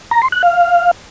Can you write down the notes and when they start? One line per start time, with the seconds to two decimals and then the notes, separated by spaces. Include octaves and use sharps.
0.11 A#5
0.22 C6
0.32 F#6
0.43 F5